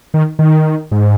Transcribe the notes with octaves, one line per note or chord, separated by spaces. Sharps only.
D#3
D#3
G#2